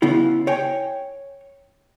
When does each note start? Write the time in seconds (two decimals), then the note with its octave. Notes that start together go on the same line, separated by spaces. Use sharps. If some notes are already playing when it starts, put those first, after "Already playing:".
0.02 C#3 B3 E4 F4
0.47 C#5 G5 G#5